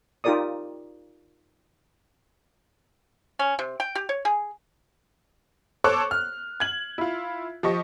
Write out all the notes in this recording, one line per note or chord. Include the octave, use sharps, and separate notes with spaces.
D#4 F4 G4 A#4 D5 D#6
C#4
C3
G5
G4
C#5
G#4
A4 C5 C#5 C#6 D6 F#6
F6
G#6 F#7
E4 F4
F3 G4 D#5 C#6